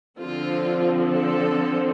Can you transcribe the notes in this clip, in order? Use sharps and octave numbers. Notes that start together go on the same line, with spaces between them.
D3 F3 C4 F4
A4